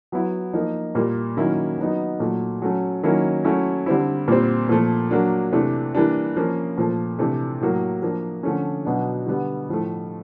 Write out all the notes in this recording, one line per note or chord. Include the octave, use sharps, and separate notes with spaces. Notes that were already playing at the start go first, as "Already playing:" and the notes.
F#3 B3 E4
F3 A#3 D#4
A#2 G3 A#3
D#3 F#3 A#3 C#4 E4
F#3 B3 D#4
A#2 F#3 A3
F#3 A3 C#4
D#3 F#3 A#3 C#4 E4
F#3 A3 C#4 E4
D3 G3 C4 E4
A#2 G3 C4
A#2 F3 A3
F#3 A#3 D4
C3 E3 A3 D4
E3 G3 A#3 D4
F3 A#3 C#4
A#2 F3 A3
C3 E3 A3 D4
A2 F#3 A#3
F3 A#3 D4
D3 F3 A3 C#4
B2 F#3 B3 D4
D3 G3 B3
A2 F3 A3